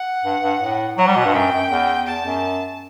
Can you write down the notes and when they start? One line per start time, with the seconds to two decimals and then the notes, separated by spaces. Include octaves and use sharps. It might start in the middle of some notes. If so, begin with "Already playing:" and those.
Already playing: F#5
0.24 G2
0.42 G2
0.60 A2
0.98 F#3 F#5
1.07 G3
1.16 B2
1.25 G2
1.34 F#2 G5
1.52 F#2
1.70 E2
2.07 E2 A5
2.25 F#2